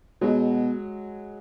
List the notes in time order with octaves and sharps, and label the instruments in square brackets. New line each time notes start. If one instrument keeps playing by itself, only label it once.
[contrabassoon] B2 [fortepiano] F#3 G#3